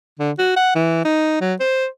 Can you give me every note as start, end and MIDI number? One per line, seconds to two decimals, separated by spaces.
0.19 0.32 50
0.39 0.56 66
0.56 0.75 78
0.75 1.04 52
1.05 1.36 63
1.41 1.54 54
1.60 1.87 72